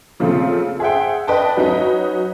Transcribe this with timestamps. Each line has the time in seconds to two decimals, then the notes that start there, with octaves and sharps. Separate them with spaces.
0.20 A#2 C#3 F3 A3 C4 F4
0.80 G#4 C5 E5 F#5 G5
1.27 B4 D5 D#5 G5 A5
1.57 F#3 C#4 D#4 B4 D#5